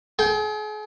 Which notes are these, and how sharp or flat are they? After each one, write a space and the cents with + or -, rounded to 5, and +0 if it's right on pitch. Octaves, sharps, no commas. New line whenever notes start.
G#4 +40 G5 +0